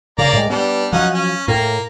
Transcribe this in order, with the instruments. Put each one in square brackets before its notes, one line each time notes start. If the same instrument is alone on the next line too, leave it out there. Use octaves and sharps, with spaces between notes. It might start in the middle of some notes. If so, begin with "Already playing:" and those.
[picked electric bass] C#3 [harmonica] A#3 D5 A#5
[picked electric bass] A2 G#3
[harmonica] G3 D4 [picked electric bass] B3
[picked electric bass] F3 F#3 [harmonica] C#4 D#4 F#5
[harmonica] C#4
[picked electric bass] A2 [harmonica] A#3 A#5